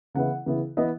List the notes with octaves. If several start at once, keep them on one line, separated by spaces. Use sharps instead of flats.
C#3 E3 B3 E4 F#5
C#3 E3 B3 E4
E3 B3 E4 D#5